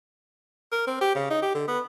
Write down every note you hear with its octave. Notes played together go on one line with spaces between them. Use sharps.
A#4
C4
G4
C#3
D#4
G4
D3
B3